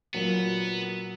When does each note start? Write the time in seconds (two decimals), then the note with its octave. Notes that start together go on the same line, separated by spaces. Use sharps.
0.14 A#2 F#3 A#3 B3